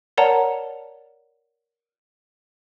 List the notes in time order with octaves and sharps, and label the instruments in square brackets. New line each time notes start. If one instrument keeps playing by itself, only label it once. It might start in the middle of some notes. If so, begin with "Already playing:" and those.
[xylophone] A#4 C#5 D5 F#5 A5 A#5